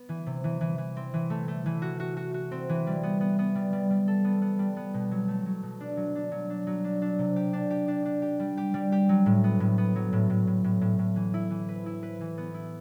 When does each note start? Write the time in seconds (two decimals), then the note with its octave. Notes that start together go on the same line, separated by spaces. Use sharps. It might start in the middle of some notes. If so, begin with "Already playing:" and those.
Already playing: B3
0.09 E3
0.26 C3
0.44 E3
0.61 E3
0.78 E3
0.97 C4
1.14 E3
1.30 A3
1.48 A3
1.66 E3
1.82 F#4
2.00 F#4
2.17 F#4
2.34 F#4
2.51 C4
2.69 E3
2.87 G3
3.03 B3
3.21 B3
3.39 B3
3.55 G3
3.73 G3
3.90 G3
4.08 A4
4.24 B3
4.41 B3
4.59 G3
4.77 B3
4.94 B2
5.11 F#3
5.28 A3
5.46 F#3
5.63 B2
5.80 D4
5.97 F#3
6.15 D4
6.32 F#3
6.50 D4
6.67 F#3
6.84 D4
7.02 D4
7.19 C3
7.36 G4
7.53 D4
7.70 G4
7.88 D4
8.05 D4
8.22 G4
8.40 G3
8.57 G4
8.74 G3
8.92 G4
9.09 F#3
9.26 A2
9.44 B3
9.60 A2
9.78 B3
9.96 F#3
10.13 A2
10.30 A2
10.47 A2
10.64 A2
10.81 A2
10.99 A2
11.16 E3
11.34 E4
11.50 E3
11.68 B4
11.86 E4
12.03 B4
12.20 E3
12.38 B3
12.54 E4